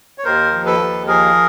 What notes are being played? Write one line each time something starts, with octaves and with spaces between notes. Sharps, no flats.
C#5
D#2 A#4 C5
F3
A4 B4
D#2
F3 G#4 A#4